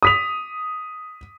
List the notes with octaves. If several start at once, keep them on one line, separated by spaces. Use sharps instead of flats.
D#6 B6 F7